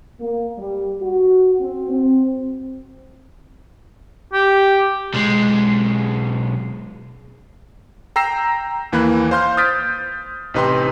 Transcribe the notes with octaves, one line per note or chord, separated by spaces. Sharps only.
A#3
G3
F#4
C4
C4
G4
B1 G#3
G5 A#5 E6 A#6 C7 E7
D#2 E3 A#3 B5 F#6
C5 F5 C6 F6 G6
D#6 F6 G6 A6 B6 D7
A1 C3 D#4 B4 G5 C6